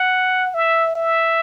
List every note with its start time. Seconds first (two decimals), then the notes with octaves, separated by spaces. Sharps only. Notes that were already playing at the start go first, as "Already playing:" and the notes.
Already playing: F#5
0.54 E5
0.95 E5